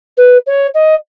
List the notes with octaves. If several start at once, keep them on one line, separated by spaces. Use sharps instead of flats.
B4
C#5
D#5